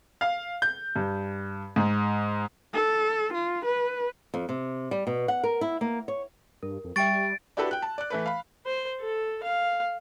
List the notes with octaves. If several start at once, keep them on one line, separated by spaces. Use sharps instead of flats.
F5
G6
G2
G#2
A4
F4
B4
F2
C3
G3
B2
F#5
A#4
E4
A#3
C#5
G2 A#4
F2
G3 E5 G5 C#6 A6 D7
D4 E4 F#4 G4 A4 B4
G5 F#6
A5
D5 F#6
E3 A3 B4
F5 B5
C5
A4
F5